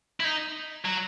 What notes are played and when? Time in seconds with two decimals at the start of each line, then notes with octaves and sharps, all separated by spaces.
0.20 E4
0.24 D#4
0.85 F#3